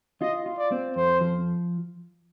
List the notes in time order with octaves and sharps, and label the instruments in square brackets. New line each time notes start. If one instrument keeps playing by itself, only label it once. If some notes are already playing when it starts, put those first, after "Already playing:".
[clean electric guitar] F4 [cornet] D#5
[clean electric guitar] F4
[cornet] D5
[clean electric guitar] C4
[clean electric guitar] F2 [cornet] C5
[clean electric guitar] F3